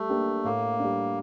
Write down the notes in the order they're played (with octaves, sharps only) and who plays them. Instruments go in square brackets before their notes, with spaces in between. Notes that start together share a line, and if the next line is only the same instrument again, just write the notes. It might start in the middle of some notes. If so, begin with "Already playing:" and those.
Already playing: [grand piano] G3 [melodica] A3
[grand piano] A#3 D4 G4
[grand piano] A2 [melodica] A#3
[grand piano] G3 D4